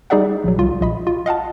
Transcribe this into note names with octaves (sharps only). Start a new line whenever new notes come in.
G3 D#4 G#4 D5 E5 F#5
A#1 F#3
C2 F4
A#1 D#5 B5
F4
D#5 F5 F#5 A5